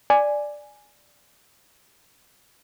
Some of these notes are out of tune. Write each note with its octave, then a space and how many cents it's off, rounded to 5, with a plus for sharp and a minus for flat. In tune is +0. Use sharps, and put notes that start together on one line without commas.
D5 +0 G#5 +0